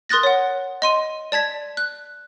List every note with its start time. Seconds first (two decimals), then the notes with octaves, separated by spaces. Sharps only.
0.09 A#4 C6 D#6 F#6 A6 A#6
0.23 C#5 F#5
0.82 D#5 C6 D#7
1.32 D5 A5 G#6 B6
1.77 F#6